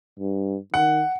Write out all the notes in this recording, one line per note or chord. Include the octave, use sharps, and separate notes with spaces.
G2
D#3 F#5